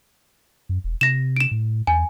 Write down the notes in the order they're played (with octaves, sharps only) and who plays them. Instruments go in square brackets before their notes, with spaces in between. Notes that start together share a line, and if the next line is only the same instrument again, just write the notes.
[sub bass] F#2
E1
[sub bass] C3 [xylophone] A#6 E7
[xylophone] D7 E7
[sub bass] A2
[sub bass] E2 [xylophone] G#5